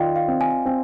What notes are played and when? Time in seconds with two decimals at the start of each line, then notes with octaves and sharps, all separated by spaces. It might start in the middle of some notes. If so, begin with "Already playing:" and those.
Already playing: D#3 F4 D5 D#5 F5 G5
0.16 F5
0.28 C4
0.41 G#5
0.66 C4